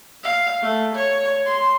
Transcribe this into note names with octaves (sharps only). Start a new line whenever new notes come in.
F5
A3
C#5
C6